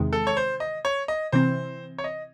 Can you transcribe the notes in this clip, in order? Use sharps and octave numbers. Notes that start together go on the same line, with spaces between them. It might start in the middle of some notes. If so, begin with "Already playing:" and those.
Already playing: E2 C3 D#3 G#3
A4
C#5
C5
D#5
C#5
D#5
C3 E3 C4 C5
C#5
D#5